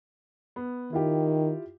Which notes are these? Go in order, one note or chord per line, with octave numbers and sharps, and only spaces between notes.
B3
D#3 E4 F4 G4